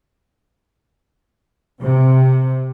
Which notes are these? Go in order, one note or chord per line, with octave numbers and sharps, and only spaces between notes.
C3